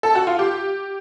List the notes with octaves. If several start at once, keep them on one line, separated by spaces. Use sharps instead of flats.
A4
F#4
F4
G4